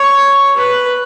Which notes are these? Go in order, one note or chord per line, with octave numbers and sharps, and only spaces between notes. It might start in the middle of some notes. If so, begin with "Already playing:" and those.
Already playing: C#5
B4